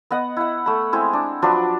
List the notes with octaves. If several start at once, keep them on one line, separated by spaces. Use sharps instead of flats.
B3 D#5 F#5
E4 F#5
A3 B5
G#3 C4 E4
D4
F3 F#3 D4 B4